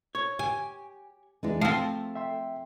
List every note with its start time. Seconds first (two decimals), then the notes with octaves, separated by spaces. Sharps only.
0.15 C#5
0.39 G4 G#5
1.43 E2 E3 G#3 D4 D#4
1.61 F3 A3 C4 F5 A5 C6
2.15 E5 G5 C6